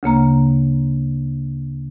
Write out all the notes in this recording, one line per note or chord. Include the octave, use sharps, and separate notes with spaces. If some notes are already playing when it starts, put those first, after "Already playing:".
D2 C#3 A#3 A#5